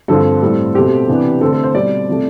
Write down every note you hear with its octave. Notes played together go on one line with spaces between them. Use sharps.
G2 D3 F3 C4 A4
A2 G3 C4
B2 A3 C4 G4
C3 E3 B3 D4
D3 A3 C4 A4
A4
C5
B2 G3 C4 D5
C3 F3 A3